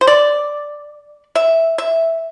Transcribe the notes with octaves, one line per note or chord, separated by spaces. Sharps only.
C5
D5
E5
E5